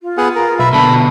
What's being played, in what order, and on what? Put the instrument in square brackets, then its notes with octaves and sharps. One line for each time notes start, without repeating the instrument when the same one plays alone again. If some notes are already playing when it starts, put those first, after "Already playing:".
[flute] F4
[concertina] B3 G#4 F#5
A#4
[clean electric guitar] B1 [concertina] B4 E5
[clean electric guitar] B2 D3 B3 [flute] A5 [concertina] B5